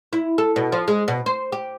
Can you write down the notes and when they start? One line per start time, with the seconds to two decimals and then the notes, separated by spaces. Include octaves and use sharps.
0.13 E4
0.38 A4
0.56 B2
0.72 F3
0.88 G#3
1.08 B2
1.26 C5
1.52 G4